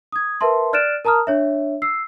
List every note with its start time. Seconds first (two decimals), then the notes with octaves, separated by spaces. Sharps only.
0.12 D#6 G#6
0.41 A#4 B4 E5 A5 C6
0.73 D5 F6 F#6 A6 D7 E7
1.05 A#4 A5 A#5 D#6 F6
1.27 D4 C#5 E5
1.82 E6 C7